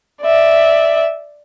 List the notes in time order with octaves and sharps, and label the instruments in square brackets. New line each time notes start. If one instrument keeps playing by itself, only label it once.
[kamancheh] D5 E5